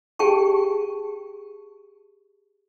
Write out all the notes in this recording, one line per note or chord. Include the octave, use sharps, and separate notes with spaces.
G4 G#4 G5 A5 C#6